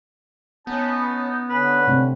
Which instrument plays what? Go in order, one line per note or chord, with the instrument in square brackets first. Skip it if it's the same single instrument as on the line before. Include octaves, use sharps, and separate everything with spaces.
[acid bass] B3 [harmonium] C#4 A5 [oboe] D#4
[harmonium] D3 C#4 [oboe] B4
[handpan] C3 A3 C4